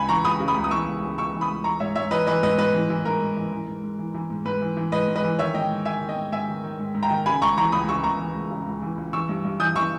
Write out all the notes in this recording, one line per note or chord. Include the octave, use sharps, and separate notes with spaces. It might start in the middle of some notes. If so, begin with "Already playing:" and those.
Already playing: C#2 C#3 G#5 B5
E3 A#5 C#6
C#2 B5 D#6
C#3
B5 D#6
C#2
D#6
E3 C#6 E6
C#2
C#3
C#2 C#6 E6
E3
B5 D#6
C#2
E3 A#5 C#6
G#2 C#5 E5
G#2 C#5 E5
E3 B4 D#5
E3 B4 D#5
G#2 B4 D#5
G#2 B4 D#5
E3
E3
G#2 A#4
G#2
E3
E3
G#2
G#2
E3
E3
G#2
G#2 B4
E3
E3
G#2 B4 D#5
G#2
B4 D#5
E3
D#3 C#5 E5
G#2 D#5 G5
G#2
D#3 E5 G#5
D#3
D#5 G5
G#2
G#2 E5 G#5
D#3
D#3
G#2
G#2
G5 A#5
D#3
C#3 G#5 B5
C#2 A#5 C#6
E3 A#5 C#6
C#2 B5 D#6
C#3 C#6 E6
C#2 A#5 C#6
E3
C#2
C#3
C#2
E3
C#2
E3 C#6 E6
G2
G2
E3 D#6 G6
E3 C#6 E6